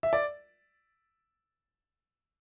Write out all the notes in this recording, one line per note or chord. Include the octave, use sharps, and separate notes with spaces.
E5
D5